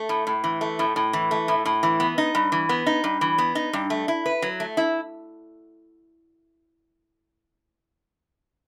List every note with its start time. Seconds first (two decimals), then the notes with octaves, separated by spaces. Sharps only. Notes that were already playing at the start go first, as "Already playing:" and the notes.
Already playing: A3
0.09 A2
0.27 A2
0.44 E3
0.61 A3
0.79 A2
0.96 A2
1.13 E3
1.31 A3
1.48 A2
1.66 A2
1.83 E3
2.00 B3
2.18 D#4
2.35 G2
2.52 E3
2.69 B3
2.87 D#4
3.04 G2
3.21 E3
3.38 B3
3.55 D#4
3.73 G2
3.90 A3
4.08 E4
4.26 B4
4.42 F#3
4.60 A3
4.77 E4